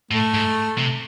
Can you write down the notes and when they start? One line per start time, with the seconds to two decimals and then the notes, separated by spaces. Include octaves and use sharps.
0.11 A2 A3
0.34 G#2
0.78 C3